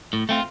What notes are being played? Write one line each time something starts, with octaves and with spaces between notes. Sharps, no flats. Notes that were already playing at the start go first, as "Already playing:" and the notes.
A2
A3 C4 F4